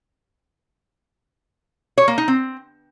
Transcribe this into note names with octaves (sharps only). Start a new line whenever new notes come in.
C#5
A#3
D#4
C4